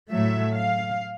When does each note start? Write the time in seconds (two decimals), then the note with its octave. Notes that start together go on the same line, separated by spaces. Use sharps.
0.10 A2 F#3 A3 E5
0.54 F5